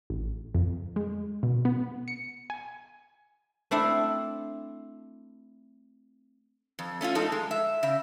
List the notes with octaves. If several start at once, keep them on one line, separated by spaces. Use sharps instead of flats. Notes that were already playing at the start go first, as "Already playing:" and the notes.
A1
F2
G#3
B2
B3
C#7
G#5
A3 C4 D4 E4
F2
A3 C#4 E4 F4
G#2 F3 D#4 A4
G#3
E5
C#3 E5